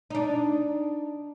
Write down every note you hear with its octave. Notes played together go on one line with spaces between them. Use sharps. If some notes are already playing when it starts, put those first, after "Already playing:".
D4 D#4